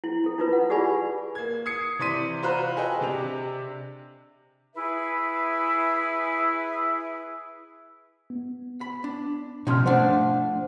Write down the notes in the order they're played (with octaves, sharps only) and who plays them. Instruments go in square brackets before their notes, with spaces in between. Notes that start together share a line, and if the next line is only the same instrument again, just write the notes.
[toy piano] E4
E4 A4
D#4 F4 B4
F#5
F4 G4 G#4 D5 G#5 B5
[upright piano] A#3 G#6
D#6 G#6 C7 C#7
C3 E3 D5 C6 B6 D#7
F4 F#4 C5 A#5 B5 F#6
G#4 A4 B4 D#5 G5
C3 D4 G4 F7
[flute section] E4 G#4 B4 E5
[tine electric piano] B3
[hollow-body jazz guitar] B5
D4
[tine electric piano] B2 C6 F6 [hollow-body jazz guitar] F3 C#4 D#4
[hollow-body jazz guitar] F3 A3 D4 [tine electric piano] C5 F#5